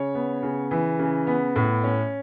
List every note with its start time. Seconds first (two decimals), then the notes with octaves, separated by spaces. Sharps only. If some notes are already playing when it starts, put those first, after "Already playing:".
Already playing: C#3 C#5
0.15 B3
0.43 C#3
0.71 E3
0.99 C#3
1.27 B3
1.56 A2
1.84 C#4